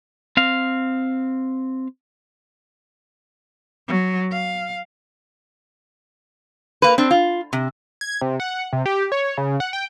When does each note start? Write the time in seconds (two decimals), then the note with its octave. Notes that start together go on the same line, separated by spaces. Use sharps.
0.37 C4 F5
3.88 F#3
4.32 F5
6.82 A#3 B4
6.98 C4 D4
7.11 F4
7.53 C3
8.01 G#6
8.21 C3
8.40 F#5
8.73 C3
8.86 G4
9.12 C#5
9.37 C#3
9.60 F#5
9.73 G5